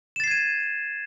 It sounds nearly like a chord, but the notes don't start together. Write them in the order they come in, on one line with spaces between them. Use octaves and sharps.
E7 A6 C7 G#6 D#7